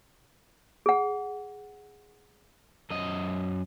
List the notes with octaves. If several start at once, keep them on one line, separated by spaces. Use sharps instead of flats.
G#4 F#5
F#2 D#5